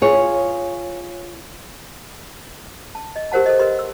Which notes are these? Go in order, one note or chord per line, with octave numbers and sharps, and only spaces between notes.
F4 G#4 C#5
A5
D#5
G4 A#4 C5 F#5 A5
A4 C5 D#5
A#4 B4 D#5 C6
E6